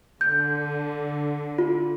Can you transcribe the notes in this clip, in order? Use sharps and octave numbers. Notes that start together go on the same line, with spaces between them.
D3 G6
F4